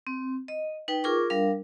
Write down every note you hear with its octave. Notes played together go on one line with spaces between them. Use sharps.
C4
D#5
D#4 B4 G5
F4 G#4 A#4 C#6 D6
G3 D4 A#4 F5